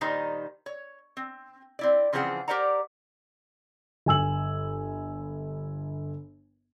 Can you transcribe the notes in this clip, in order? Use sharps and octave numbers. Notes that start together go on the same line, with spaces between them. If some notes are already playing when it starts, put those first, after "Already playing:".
A#2 D#3 G3 D#4 C5 A#5
C#5
C4
C4 E4 D5
C#3 E3 F3 C4 G#4 F#5
G4 A#4 C5 D5 F#5 A#5
G1 G#5 E6 F#7